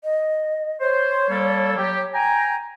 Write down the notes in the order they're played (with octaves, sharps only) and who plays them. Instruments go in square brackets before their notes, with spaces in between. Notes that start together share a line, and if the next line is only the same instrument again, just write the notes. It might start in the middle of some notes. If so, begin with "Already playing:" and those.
[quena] D#5
[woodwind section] C5 [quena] C#5
[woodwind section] G3 A#3 A4
F#3 G4
G5 G#5 A#5